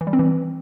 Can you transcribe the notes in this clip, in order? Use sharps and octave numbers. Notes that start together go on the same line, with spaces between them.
E3
G3
C4
E3